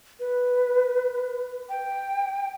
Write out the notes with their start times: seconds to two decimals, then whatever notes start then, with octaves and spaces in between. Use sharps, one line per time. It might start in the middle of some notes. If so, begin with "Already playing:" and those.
0.20 B4
1.69 G5